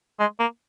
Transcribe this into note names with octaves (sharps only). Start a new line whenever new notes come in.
G#3
A#3